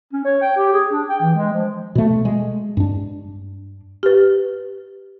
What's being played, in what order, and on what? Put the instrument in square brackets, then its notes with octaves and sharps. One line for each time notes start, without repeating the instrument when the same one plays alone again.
[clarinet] C#4
C#5
G5
G4
G#4
D4
G5
E3
G#3
F3
[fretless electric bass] B2 A3
G#3
G2 D4
[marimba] G4 B4